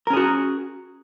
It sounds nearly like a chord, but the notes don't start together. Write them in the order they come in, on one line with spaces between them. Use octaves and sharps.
A#4 C#4 G#4 F#4